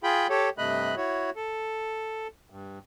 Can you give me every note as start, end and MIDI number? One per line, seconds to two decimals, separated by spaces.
0.04 0.27 65
0.04 0.27 68
0.04 0.27 79
0.04 0.27 83
0.29 0.49 67
0.29 0.49 69
0.29 0.49 73
0.58 0.95 43
0.58 0.95 48
0.58 0.95 57
0.58 0.95 75
0.58 0.95 83
0.58 0.95 90
0.97 1.30 64
0.97 1.30 66
0.97 1.30 73
1.36 2.27 69
2.50 2.79 43